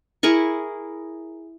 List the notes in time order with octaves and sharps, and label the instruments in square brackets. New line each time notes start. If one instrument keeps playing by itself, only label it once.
[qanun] E4 G#4 A#4 C#6